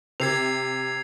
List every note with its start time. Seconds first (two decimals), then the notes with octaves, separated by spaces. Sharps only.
0.20 C3 G#6 C7 F7